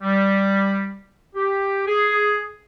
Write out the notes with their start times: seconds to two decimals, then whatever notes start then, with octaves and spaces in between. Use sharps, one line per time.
0.02 G3
1.35 G4
1.88 G#4